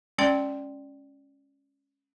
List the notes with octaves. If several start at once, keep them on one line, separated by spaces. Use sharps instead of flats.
G#3 C#4 D5 G5 C6